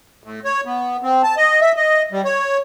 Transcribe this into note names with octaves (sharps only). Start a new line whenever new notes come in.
A2
C#5
B3
C4
A5
D#5
E5
D#5
G3
C#5